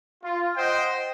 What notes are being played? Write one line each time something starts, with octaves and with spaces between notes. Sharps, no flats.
F4
C5 D#5 F#5 G5